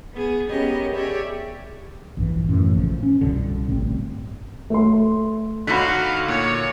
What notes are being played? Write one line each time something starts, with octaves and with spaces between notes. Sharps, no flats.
B3 G#4
B3 C#4 G4 G#4 A#4 D#5
G4 G#4 C#5 D5 E5
A#1 G2 E3
F#2 A2 E3
A#1 C#3 F3
C#4
C2 G2 B2 D3
A1 G2 C4
A3 C6
D3 D#4 F#4 F5 B5 B6
A#2 C#5